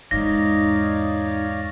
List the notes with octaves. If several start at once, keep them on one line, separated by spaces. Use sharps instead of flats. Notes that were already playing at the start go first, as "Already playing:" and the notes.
E2 G#2 D#4 C#5 D5 F5 A#6